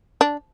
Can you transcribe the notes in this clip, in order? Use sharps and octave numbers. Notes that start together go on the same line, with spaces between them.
D4